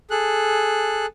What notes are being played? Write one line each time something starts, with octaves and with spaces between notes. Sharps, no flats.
G#4 A4 F#6